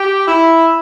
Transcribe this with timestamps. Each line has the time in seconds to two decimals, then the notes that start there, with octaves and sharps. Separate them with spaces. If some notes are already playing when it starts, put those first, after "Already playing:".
Already playing: G4
0.27 E4